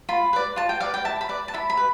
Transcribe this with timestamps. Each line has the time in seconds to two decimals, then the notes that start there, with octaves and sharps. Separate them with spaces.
0.09 F4 B5
0.33 B4 D5
0.56 F4 A5
0.69 G5
0.80 B4 D5 F5
0.94 G5
1.05 E4 A5
1.21 B5
1.29 B4 D5
1.48 A5
1.54 E4 B5
1.70 B5
1.77 B4